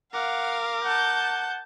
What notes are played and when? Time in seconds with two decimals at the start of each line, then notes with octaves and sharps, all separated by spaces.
0.13 A#4 F5 F#5 D6
0.84 F#5 A5 G6